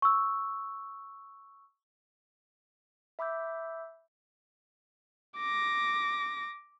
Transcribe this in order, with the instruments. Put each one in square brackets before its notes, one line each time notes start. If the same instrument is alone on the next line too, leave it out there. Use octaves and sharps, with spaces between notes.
[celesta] C#6 E6
[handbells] E5 B5 D6 E6 G6
[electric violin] D6 A#6